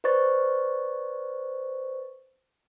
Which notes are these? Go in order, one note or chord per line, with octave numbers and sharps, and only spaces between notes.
B4 C5 D5 C#6 A6